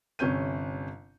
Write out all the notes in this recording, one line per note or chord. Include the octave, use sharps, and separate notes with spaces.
G1 C3 C#4 G6 D#7